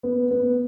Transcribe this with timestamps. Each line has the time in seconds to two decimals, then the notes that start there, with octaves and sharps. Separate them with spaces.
0.03 B3
0.31 B3